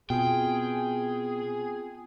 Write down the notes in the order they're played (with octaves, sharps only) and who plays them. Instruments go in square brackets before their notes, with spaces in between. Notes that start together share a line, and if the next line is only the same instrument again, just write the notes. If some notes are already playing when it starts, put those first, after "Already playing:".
[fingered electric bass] B2 [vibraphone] B3 C4 F4 [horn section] G#4 [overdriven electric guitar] G5